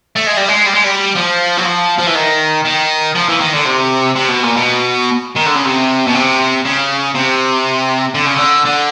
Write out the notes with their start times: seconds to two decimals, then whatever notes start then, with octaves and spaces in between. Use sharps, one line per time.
0.16 A3
0.27 G#3
0.37 G3
0.48 G#3
0.66 G3
0.74 G#3
0.84 G3
1.16 F3
1.58 F#3
1.65 F3
1.99 F3
2.07 E3
2.15 D#3
2.65 D#3
3.15 F3
3.28 E3
3.40 D#3
3.53 D3
3.65 C3
4.16 C3
4.28 B2
4.43 A#2
4.57 B2
5.36 D#3
5.46 D3
5.55 C#3
5.65 C3
6.07 B2
6.15 C3
6.65 C#3
7.14 C3
8.15 D3
8.26 C#3
8.36 D3
8.65 D3